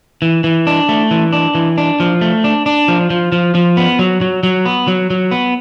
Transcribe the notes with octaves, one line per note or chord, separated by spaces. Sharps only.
E3
E3
D4
A3
E3
D4
E3
D4
F3
A3
D4
D4
F3
F3
F3
F3
B3
F#3
F#3
F#3
B3
F#3
F#3
B3